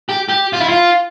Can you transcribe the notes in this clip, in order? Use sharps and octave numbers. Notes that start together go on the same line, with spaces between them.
G4
G4
F4
E4
F4